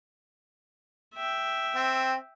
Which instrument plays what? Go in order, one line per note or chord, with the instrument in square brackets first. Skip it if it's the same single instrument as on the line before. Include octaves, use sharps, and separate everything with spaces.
[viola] E5 G5
[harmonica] C4